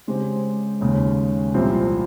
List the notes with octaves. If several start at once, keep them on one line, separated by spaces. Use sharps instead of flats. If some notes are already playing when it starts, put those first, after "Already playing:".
C#3 G#3 C4 G4 C5
D#2 C#3 G#3
C2 A#2 F3 C4 G4